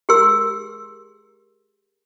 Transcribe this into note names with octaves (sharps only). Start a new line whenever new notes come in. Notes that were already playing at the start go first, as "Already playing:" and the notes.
G4 G#4 A#4 C6 E6